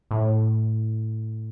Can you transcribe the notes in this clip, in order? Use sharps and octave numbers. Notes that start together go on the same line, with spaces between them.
A2